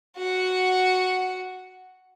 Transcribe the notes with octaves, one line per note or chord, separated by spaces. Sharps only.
F#4 F#5